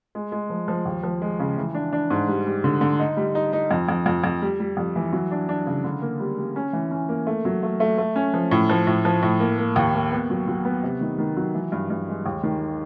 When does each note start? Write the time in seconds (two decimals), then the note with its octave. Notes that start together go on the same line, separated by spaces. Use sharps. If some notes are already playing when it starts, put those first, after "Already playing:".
0.15 G#3
0.32 G#3
0.50 F3
0.68 F3
0.85 D#2
1.03 F3
1.22 G#3
1.39 C#3
1.57 E3
1.74 D4
1.93 D4
2.10 G#2
2.28 G3
2.46 G3
2.64 D3
2.81 D3
2.99 D#4
3.17 G3
3.35 D#4
3.53 D#4
3.71 F2
3.89 F2
4.06 F2
4.24 F2
4.42 G3
4.60 G3
4.77 F2
4.96 E3
5.13 F#3
5.31 D4
5.49 D4
5.66 C#3
5.84 D3
6.02 A#3
6.20 G3
6.38 G3
6.56 C#4
6.73 E3
6.91 C#4
7.09 A#3
7.27 A3
7.45 F#3
7.63 A3
7.80 A3
7.98 A3
8.16 C#4
8.34 F3
8.51 A2
8.69 F3
8.87 A2
9.05 F3
9.23 A2
9.40 A#3
9.58 A#3
9.76 D#2
9.94 A#3
10.12 B3
10.30 F#3
10.48 F#3
10.65 B3
10.83 C3
11.01 D#3
11.18 D#3
11.37 F#3
11.55 E3
11.72 G2
11.90 G2
12.08 G#3
12.26 D#2
12.43 D#3